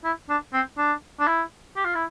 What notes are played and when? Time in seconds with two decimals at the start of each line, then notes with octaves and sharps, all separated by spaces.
0.04 E4
0.29 D4
0.53 C4
0.78 D4
1.20 D4
1.27 E4
1.76 G4
1.85 F4
1.95 E4